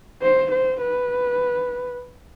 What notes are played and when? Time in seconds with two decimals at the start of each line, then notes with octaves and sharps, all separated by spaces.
0.22 C5
0.51 C5
0.81 B4